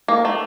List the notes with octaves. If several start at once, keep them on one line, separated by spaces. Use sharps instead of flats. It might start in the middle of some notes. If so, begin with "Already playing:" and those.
A#3
A3